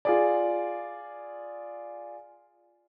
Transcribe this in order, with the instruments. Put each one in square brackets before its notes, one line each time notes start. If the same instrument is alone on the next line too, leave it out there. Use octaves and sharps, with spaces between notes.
[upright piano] F4 G#4 D5